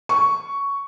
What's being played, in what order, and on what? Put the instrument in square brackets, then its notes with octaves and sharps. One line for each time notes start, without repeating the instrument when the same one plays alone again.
[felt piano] C#6